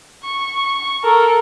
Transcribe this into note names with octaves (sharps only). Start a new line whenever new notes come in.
C#6
C#6
A4 A#4